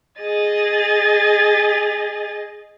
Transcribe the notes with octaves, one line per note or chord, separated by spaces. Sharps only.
G#4 D#5 A6